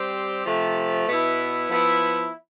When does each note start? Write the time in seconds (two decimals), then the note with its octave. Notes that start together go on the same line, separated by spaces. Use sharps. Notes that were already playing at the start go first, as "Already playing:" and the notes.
Already playing: G3 C4 G4 C5
0.45 C3 F3 A3
1.07 B2 B3 E4
1.69 F3 B3 E4